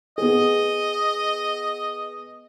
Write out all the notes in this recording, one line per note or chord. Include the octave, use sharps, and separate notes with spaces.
B3 G#4 D#5